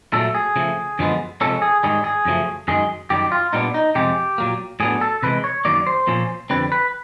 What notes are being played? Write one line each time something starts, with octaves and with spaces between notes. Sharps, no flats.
A#2 F#3 A3 A4
G#4
C#3 F3 A3
F#2 D3 F3 G#3 B3
C3 F3 G#3 C#4 A4
G#4
G#2 D#3 G3 G#4
G#4
F#2 C#3 F3 A3
F#2 D#3 G#3 G#4
F#2 D#3 G3 G4
F4
A#2 G3 B3 D4 D#4
D#4
F2 C3 F3 G#3 G4
A#2 F#3 A#3
A2 F#3 B3 D4 G#4
A4
C3 E3 G#3 B4
C#5
F#2 D#3 F#3 A#3 D5
C5
A#2 F3 A#3 C#4
F2 D3 G3 C4 B4
B4